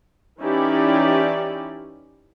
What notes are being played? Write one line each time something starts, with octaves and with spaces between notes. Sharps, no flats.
E3 C#4 D#4 E4 G4 D5